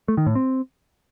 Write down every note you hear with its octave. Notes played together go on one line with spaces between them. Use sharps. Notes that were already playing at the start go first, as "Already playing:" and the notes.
A3
D#3
A2
C4